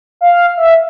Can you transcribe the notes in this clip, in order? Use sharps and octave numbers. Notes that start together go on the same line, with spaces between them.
F5
E5